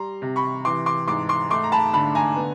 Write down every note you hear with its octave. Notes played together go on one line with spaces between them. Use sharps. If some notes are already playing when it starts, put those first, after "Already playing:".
Already playing: G3 A#5 C6
C3
B5 C#6
E3 C6 D6
C6 D6
G#2 C6 D6
C6 D6
A3 C6 D6
A#5
A5 B5
D3 A5 B5
G#5 A#5
B3